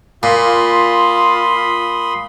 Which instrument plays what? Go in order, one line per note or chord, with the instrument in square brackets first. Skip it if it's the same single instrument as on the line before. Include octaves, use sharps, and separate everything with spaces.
[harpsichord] A#2 [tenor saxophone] F4 [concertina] B5 C6 D#6